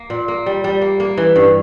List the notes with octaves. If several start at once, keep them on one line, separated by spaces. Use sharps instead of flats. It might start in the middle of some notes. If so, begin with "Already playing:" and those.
Already playing: A#3
A#2
A#3
G3
G3
A#3
A#3
E3
G2